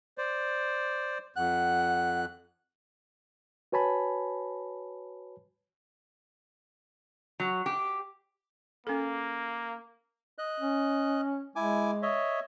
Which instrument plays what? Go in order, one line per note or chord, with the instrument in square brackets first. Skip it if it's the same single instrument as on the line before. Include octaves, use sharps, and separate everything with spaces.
[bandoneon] C5 D5
[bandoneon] F2 F#6 [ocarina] F#5
[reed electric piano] F#4 B4 C#5 G#5 A5 B5
[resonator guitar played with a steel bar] F#3
G4
[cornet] A#3 [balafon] C#4 A4
[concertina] D#5 F#6
[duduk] C#4
[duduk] G#3 [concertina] E4 G#5 D6
[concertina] C#5 D#5 E5